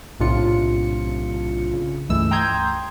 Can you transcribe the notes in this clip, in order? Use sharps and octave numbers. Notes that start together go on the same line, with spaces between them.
B1 A2 C3 D4 F4 C#7
C#3
C#2 G2 E3 G#3 A3 E6
G5 A#5 C6 D#6 G6 G#6